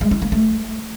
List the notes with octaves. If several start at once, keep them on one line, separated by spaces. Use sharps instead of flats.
G#3
E4
A#3
A3